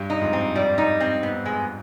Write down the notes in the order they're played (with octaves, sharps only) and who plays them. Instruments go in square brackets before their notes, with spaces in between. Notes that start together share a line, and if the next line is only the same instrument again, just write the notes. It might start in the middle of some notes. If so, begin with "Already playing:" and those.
Already playing: [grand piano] G2
[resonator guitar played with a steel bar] D#4
[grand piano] F2 G#2
[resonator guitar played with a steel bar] C4
G3
D#4
C4
B3
G#3